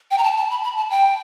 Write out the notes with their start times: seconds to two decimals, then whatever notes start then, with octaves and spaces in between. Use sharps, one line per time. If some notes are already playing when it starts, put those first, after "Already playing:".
0.11 G5
0.18 A#5
0.24 A5
0.37 A5
0.51 B5
0.64 B5
0.77 A5
0.90 G5